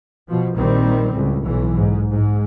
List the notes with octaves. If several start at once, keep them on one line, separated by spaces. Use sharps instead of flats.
B2 F3
A#1 D#3 G3 C4
C#2 A2
B1 E3
G#2
G#2